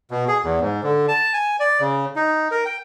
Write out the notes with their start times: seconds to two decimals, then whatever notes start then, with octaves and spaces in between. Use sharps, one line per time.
0.11 B2
0.28 G#4
0.44 E2
0.61 G#2
0.83 D3
1.08 A5
1.33 G#5
1.60 D5
1.80 C#3
2.16 D#4
2.51 A#4
2.65 G5